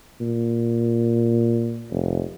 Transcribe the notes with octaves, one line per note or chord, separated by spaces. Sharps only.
A#2
F1